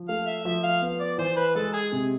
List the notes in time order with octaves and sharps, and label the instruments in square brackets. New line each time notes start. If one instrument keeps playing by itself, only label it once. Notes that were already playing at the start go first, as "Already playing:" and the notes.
Already playing: [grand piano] F3
[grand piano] A3 [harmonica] F5
[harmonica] E5
[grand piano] F3 [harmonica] E5
[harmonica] F5
[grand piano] B3
[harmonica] D5
[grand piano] E3 [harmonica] C5
[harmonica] B4
[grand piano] G#3 [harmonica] A4
[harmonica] G#4
[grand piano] C3